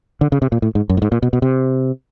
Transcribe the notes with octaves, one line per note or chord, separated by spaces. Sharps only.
D3
C#3
C3
A#2
A2
G#2
F#2
A2
G#2
A#2
B2
B2
C3